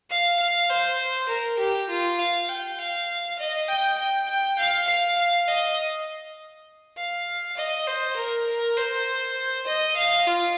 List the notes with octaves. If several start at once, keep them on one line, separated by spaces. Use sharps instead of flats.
F5
F5
C5
A#4
G4
F4
F5
G5
F5
D#5
G5
G5
G5
F5
F5
F5
D#5
F5
D#5
C5
A#4
A#4
C5
D#5
F5
F4